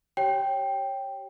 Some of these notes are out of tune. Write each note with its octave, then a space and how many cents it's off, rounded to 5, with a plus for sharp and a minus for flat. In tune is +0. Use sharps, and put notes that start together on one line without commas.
G4 -25 C#5 -15 G5 +0